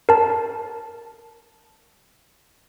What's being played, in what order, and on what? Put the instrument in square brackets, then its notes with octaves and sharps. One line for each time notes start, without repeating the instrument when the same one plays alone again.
[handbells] A#4 A5